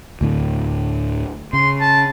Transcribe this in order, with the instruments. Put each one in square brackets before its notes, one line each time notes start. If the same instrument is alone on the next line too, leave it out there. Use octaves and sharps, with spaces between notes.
[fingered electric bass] D2 A2 D3
[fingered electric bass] C#3 [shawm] C6
[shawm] A5